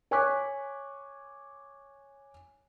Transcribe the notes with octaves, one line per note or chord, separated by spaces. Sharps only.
C#5 G#5 C#6 D6 F#6 B6